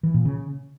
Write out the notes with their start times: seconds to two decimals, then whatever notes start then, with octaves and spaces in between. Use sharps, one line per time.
0.03 E3
0.14 A#2
0.25 C#3